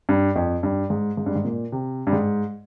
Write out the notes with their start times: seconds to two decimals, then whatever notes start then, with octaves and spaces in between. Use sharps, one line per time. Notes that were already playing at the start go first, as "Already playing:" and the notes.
0.09 G2
0.36 F2
0.63 G2
0.90 G#2
1.17 G#2
1.26 G2
1.36 G#2
1.45 A#2
1.72 C3
2.07 G2
2.13 G#2